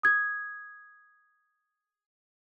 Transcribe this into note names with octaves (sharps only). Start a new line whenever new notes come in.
D#6 G#6